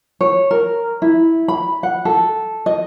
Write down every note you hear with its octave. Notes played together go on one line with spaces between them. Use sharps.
C#5
A#4
E4
B5
F#5
A4
D#5